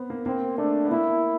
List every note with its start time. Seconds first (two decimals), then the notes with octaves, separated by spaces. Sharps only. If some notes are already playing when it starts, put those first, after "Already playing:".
Already playing: B3 C4
0.10 A#3
0.26 A#3 C4
0.58 A3 D4
0.85 B3
0.90 A#3 E4